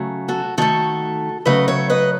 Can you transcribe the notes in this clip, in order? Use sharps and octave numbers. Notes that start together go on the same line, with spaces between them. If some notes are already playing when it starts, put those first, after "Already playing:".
Already playing: C#3 F#3 A3
F#4 A4
D#3 A3 F#4 A4
C#3 F#3 A3 B4 D#5
C#5 E5
B4 D#5